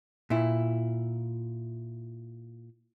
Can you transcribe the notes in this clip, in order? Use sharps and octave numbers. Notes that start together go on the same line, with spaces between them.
A#2 E4